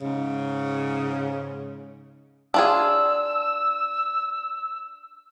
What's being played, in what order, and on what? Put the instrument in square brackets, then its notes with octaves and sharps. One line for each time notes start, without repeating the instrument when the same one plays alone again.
[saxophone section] G#2 C#3
[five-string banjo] D4 F4 G#4 [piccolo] E6